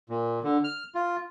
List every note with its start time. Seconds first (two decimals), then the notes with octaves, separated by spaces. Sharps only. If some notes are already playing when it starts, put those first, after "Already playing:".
0.10 A#2
0.44 D3
0.64 F6
0.95 F4